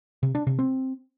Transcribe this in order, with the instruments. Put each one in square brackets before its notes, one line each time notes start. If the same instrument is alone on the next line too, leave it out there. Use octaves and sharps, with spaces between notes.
[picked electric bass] C3
D4
C3
C4